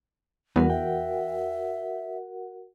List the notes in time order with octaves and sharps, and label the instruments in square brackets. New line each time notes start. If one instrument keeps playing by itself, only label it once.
[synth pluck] E2 [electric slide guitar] G3 B3 [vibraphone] F#4 A#4 F#5
[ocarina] E5 [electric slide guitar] G5